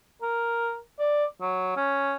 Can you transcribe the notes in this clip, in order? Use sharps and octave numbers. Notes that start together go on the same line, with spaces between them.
A#4
D5
F#3
C#4